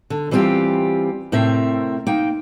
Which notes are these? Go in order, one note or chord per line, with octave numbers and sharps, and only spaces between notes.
D3
E3 G3 C4 E4 F4 G4
A2 C3 C4 A#4 E5
A#3 D#4 G5